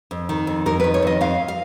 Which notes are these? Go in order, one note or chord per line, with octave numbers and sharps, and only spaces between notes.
F2
D#3
F2
F2 A#4
D#3 B4
C#5
F2 D#5
F2 F5
F5